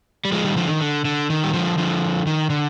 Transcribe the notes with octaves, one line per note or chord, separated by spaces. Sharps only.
G3
F3 G#3
D#3 G3
D3 F3
D#3
D3
D3
D#3
G3
D3 F3
D3 F3
D#3
D3